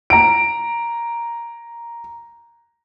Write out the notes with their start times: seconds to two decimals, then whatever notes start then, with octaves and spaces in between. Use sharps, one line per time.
0.10 A#5 D7